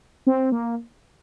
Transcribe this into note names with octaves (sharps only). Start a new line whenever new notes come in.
C4
A#3